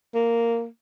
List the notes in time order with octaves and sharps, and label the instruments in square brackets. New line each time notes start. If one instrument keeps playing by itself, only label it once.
[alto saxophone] A#3